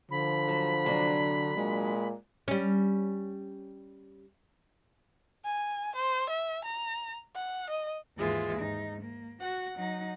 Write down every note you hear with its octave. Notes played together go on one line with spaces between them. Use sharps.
D3 F3 B5
F#3
C3 F#3 D4
A#2 G#3
G3 C#4
G#5
C5
E5
A#5
F#5
D#5
D#2 G#2 E3 G#3 F4 E5
G#2 D#4
A#3
F#4 F#5
F#3 D#4 F#5